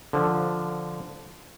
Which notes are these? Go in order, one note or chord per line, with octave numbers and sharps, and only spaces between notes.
D3 F3